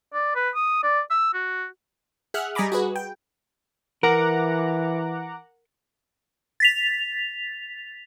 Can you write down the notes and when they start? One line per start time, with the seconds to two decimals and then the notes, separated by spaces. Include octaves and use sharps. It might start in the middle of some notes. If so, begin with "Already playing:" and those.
0.14 D5
0.35 B4
0.55 D#6
0.83 D5
1.10 E6
1.34 F#4
2.34 G#4 E5 F#5 F6 F#6
2.55 G3 D#5 G#5 A#5 B5 D6
2.72 F#4 G#4 B4
2.96 G5
4.03 E3 A#4 F#5 A#5 D6
6.60 A6 B6 F7